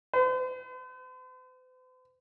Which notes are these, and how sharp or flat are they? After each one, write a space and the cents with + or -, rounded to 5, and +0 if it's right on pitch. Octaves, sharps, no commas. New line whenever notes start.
C5 -45